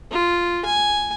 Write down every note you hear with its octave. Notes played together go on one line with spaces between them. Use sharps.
F4
G#5